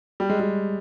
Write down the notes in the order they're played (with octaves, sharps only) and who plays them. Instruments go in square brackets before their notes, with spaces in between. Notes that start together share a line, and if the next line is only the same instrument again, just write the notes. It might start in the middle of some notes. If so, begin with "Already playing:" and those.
[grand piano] G3
G#3
G3